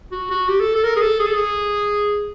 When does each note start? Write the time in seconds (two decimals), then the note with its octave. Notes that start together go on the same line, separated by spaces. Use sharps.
0.11 F#4
0.30 F#4
0.48 G4
0.60 A4
0.75 A4
0.84 A#4
0.96 G#4
1.02 A4
1.19 G#4
1.27 A4
1.34 G#4